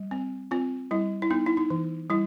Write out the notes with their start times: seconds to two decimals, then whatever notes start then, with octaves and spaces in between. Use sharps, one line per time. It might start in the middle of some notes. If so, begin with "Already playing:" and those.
Already playing: G3
0.11 C4
0.51 C4 F4
0.91 G3 E4
1.22 E4
1.31 B3 D#4
1.46 E4
1.57 D#4
1.70 E3
2.10 G3 E4